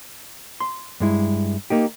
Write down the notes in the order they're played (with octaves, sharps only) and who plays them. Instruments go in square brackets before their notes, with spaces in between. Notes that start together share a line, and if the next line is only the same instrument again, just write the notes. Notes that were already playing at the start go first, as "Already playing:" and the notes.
[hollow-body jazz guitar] C6
G2 G#3 E4
A#3 D#4 G4